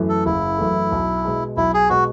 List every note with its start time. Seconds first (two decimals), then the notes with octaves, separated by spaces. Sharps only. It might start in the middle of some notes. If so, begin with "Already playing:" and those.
Already playing: F#2 E3 A3
0.09 A4
0.25 F#1 E4
0.58 F#2 E3 A3
0.92 B1
1.25 B2 G#3
1.57 B1 E4
1.74 G#4
1.89 B2 G#3 F#4